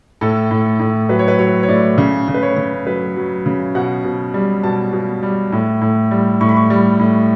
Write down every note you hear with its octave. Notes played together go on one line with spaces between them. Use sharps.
A2 A4
A2
A2
F#3 B4
C#5
B4
F#3 C#5
C#5
A2 D5
C#3
C#3
B4
C#5
C#3
F#3 B4
F#3
C#3
B2 F#5
B2
G3
B2 A5
B2
G3
A2
A2
G3
A2 C#6
B5
C#6
G3
A2